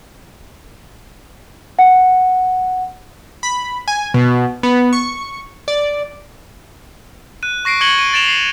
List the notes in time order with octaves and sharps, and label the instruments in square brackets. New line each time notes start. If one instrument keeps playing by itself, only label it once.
[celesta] F#5
[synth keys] B5
G#5
B2
B3
C#6
D5
[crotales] F#6 D#7
C#6 A#6 C7 D7
C#6 G#6 C#7 D#7 F#7 G7
D#7
A6 D7 E7 F7 G7
C7